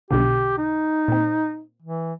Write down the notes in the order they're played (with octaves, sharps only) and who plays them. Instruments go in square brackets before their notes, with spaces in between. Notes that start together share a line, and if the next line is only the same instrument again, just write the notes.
[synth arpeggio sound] B1 B2 D3 [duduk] G4
[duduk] D#4
[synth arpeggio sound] A#2 C4
[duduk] E3